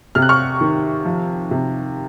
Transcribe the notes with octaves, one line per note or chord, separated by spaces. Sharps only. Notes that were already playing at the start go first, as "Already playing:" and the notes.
C3 F6
F#6
C#6 F6
D#3
F3
C3